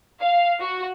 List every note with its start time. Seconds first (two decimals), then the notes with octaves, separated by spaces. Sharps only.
0.20 F5
0.60 F#4